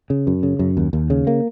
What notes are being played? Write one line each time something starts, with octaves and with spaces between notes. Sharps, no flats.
C#3
F#2
C#3
F#2
D#2
D#2
C#3
A#3